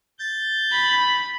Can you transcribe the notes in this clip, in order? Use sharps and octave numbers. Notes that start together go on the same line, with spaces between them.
G6 A6
B5